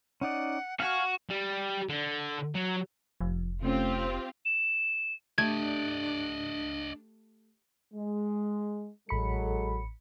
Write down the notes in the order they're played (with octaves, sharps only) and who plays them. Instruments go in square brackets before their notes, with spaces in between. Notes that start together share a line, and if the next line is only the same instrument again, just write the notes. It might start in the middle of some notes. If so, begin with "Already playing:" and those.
[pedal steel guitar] C#4 D#4 D5 [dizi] F#5
[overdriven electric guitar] F#4 [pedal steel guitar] F5 G#5 [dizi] F6
[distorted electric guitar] G3
D3
F#3
[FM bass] F1 [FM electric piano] F3
[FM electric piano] C3 A3 C#4 [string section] C4 F4 G4
[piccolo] E7
[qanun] A3 G4 [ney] D4 [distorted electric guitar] D5 D#5 [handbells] G#6
[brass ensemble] G#3
[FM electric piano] A1 B5 C#7 [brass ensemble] F#3 G#3 A4